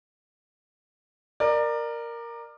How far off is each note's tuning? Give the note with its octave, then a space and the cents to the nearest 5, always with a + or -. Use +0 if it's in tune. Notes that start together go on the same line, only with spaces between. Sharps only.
A#4 +0 D5 +25